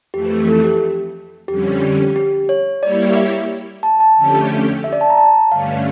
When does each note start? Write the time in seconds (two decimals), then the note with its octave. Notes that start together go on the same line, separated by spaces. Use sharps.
0.14 F2 E3 A3 G4
0.47 A4
0.64 G4
1.48 F2 D3 G3 C#4 G4
1.82 G4
2.16 G4
2.49 C#5
2.83 G3 A#3 E4 G4 C#5 D5
3.16 E5
3.83 A5
4.00 A5
4.17 F2 D3 A3 C#4 G4
4.84 E5
4.92 D5
5.01 A5
5.10 A#5
5.18 A5
5.51 G2 D3 A3 C#4 F5